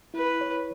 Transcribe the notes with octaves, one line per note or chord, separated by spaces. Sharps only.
E4 B4
C#5